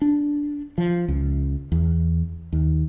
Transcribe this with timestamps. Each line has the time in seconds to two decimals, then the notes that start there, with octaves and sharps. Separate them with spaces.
0.02 D4
0.78 F3
1.08 C#2
1.72 E2
2.53 D#2